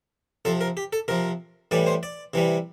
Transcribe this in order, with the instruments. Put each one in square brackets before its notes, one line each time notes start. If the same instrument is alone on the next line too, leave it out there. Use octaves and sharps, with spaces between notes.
[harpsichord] C3 F3 A4
A#4
G4
A4
C3 F3 A#4
A2 E3 G3 D5
C5
D5
C3 E3 G3